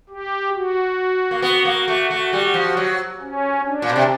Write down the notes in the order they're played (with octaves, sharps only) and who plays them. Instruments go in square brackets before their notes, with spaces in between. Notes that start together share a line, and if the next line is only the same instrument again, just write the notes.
[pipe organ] G4
F#4
[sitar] A#3
B3
A#3
A3
A3
G3
F3
F#3
[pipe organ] C#4
D4
[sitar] A#2
B2
C3